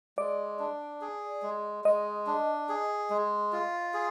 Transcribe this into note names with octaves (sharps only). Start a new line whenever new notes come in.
G#3 D5
D4
G#4
G#3
G#3 D#5
D4
G#4
G#3
F4
G#4